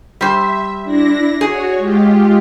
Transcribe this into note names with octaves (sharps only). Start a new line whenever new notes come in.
G3 C5 E5
D4 E4 A#6
F#4 G#4 C#5
G#3 F4 G4